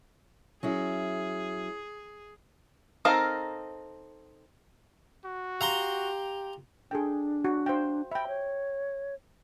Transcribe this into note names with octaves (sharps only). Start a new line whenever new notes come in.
F#3 C#4 E4 G#4
C4 D#4 A4 A#4 F5
F#4
G4 F5 A#5 C6
D4 G#4 A4 G5
F#4
C5 F5 G5
E5 G5 B5
C#5